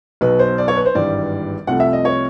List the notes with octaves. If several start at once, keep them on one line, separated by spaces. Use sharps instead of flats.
B1 B2 F#3 B4
C5
D5
C#5
B4
C5
G#1 G2 E3 G3 D5
C2 C3 F3 A3 F#5
E5
D#5
C#5